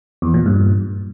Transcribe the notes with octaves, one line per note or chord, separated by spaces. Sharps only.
E2
A#2
G2